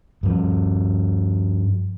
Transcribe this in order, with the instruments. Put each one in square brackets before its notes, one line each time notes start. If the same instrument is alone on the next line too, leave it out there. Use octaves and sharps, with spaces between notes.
[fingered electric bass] G2 F3